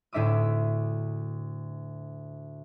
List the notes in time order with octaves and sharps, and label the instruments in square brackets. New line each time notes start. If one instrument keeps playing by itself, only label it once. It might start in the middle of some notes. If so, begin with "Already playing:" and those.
[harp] D2 A2 D4 E5 D6 D#6